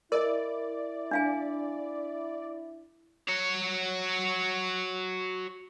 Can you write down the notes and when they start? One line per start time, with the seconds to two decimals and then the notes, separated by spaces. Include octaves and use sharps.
0.12 E4 A#4 D5 D#5
1.11 D4 F5 G#5
3.29 F#4 C#5